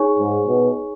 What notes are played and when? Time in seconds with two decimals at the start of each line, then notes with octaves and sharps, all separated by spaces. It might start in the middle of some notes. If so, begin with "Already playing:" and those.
Already playing: D#4 G#4 C#5 G#5 C#6
0.18 G#2
0.47 B2